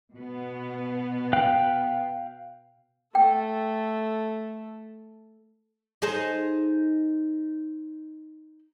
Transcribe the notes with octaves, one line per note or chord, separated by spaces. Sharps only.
B2 B3
F5 G5 F#6
A3 A4 G5
D#4 G#4 C5